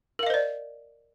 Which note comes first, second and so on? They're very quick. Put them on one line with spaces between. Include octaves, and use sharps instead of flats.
A#4 F5 D#5 C5 D5